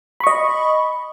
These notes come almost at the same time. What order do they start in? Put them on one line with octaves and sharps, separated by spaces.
B5 C#6 D#5